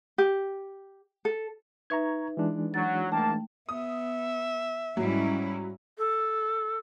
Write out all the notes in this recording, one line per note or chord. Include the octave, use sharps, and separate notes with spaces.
G4
A4
D#4 B4 E5 A#5 C#6 G#6
E3 G#3 D4
F#3 A6
F#1 A3 A#3 G5 A5
B3 E5 D#6
G#2 F#3 G3 C#4 E4
A4